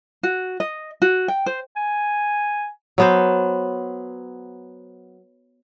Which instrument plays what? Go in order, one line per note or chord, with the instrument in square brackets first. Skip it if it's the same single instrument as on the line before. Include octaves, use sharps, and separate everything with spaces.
[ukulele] F#4
D#5
F#4
G5
C5
[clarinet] G#5
[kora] F#3 B3 C5